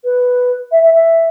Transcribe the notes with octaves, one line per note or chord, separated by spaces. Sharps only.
B4
E5
E5
E5